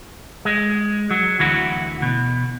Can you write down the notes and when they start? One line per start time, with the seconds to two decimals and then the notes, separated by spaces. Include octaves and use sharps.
0.45 G#3
1.11 F#3
1.39 D2 E3 F#4
2.02 B2